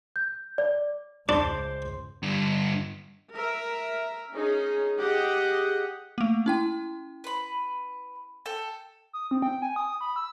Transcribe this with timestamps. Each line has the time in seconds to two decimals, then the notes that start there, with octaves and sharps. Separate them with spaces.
0.16 G6
0.58 D5
1.29 C#2 D4 C5 C6 D6
2.23 G2 D3
3.33 A#4 E5
4.33 C#4 D#4 G#4
4.98 G4 G#4 D#5 F#5
6.18 A3 A#3
6.46 C#4 E4 G5
7.24 B4 B5
8.46 A4 G5
9.13 D#6
9.31 C4
9.42 G5
9.62 G#5
9.76 D#6
10.01 B5
10.16 E6